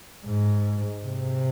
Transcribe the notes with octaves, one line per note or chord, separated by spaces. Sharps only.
G#2
C3